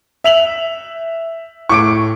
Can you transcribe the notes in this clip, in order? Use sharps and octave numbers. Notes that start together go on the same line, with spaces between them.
E5 F7 F#7
A2 C#6 D6 D7